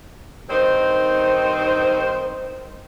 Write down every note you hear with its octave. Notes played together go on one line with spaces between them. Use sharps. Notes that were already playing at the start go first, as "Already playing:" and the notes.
G2 D#3 C4 D#4 C5